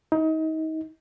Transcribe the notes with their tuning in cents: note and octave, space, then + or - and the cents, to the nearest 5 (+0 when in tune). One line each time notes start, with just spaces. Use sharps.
D#4 +30